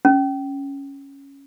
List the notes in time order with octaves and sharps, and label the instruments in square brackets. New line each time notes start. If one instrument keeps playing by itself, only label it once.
[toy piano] C#4